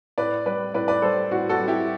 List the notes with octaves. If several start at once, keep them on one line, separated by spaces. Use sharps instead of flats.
A2 B4 D5
G3 B4 D5
A2 B4 D5
B4 D5
G3 A4 C5
A2 F#4
F#4 A4
G3
E4 G4